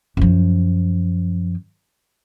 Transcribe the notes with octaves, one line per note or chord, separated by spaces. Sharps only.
F#2 F3